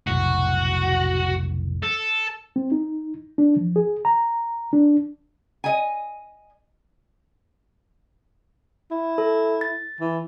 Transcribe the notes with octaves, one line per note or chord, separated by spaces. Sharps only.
F1 B1 A2 F#4
A4
C4
D#4
D4
F3
G#4
A#5
D4
D#5 G#5
E4
A4
A6
E3